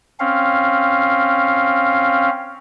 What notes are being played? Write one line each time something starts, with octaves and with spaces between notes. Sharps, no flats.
C4 C#4 F5